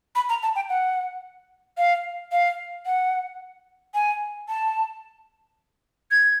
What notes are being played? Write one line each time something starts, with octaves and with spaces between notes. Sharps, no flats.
B5
A#5
A5
G5
F#5
F5
F5
F#5
G#5
A5
G#6